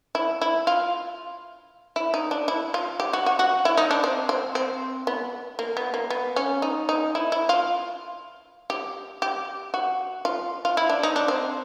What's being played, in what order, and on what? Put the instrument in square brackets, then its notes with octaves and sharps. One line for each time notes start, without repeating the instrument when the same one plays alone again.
[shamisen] E4
E4
F4
E4
D#4
D4
E4
F4
G4
F#4
F#4
F#4
E4
D#4
D4
C4
C4
C4
B3
A#3
B3
A#3
B3
C#4
D#4
D#4
E4
E4
F4
G4
G4
F#4
F4
F4
E4
D4
D#4
D4
C4